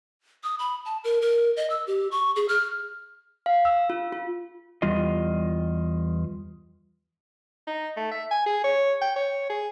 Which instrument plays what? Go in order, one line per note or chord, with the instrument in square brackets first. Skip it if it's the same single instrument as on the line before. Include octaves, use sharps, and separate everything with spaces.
[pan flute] D#6
B5
A5
A#4
A#4
D#5
E6
G4
C#6
G#4
F6
[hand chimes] F5
E6
F4
F4
[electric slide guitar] E2 G3 F4 D#5
[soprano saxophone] D#4
A3
E5
G#5
G#4
C#5
G5
C#5
G#4